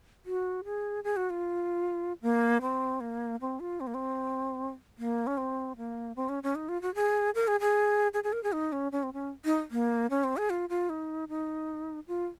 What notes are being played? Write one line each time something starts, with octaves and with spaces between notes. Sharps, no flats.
F#4
G#4
G#4
F#4
F4
A#3
C4
A#3
C4
F4
C4
A#3
C4
A#3
C#4
C4
A#3
C4
C#4
C#4
D#4
F4
F#4
G#4
A#4
G#4
G#4
G#4
G#4
A#4
G#4
D#4
C#4
C#4
C4
C#4
D#4
A#3
C#4
C4
G#4
F4
F4
D#4
D#4
F4